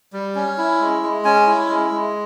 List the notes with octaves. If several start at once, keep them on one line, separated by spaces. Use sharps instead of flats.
G3
C#4
E4
G#3
G#3
C#4 G#5
E4
G#3
G#3